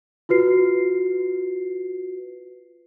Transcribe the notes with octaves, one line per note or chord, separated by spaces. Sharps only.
F4 F#4 B4 C7